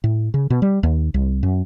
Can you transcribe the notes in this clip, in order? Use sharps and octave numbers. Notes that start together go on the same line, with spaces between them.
A2
C#3
B2
G3
D#2
C2
F#2